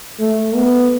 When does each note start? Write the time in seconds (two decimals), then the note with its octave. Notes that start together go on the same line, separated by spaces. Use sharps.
0.20 A3
0.56 B3